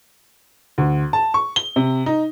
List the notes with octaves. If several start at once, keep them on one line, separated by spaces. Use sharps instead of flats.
D2
A5
C#6
G7
C3
D#4